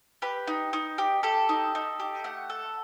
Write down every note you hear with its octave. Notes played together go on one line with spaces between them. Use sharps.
G4 B4
D#4
D#4
G4
G4 A4
D#4
D#4
G4
A3 F#5
A4